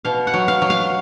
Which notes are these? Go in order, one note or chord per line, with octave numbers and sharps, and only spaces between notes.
B2 F5
F#5
F#3
F5
F#3
F5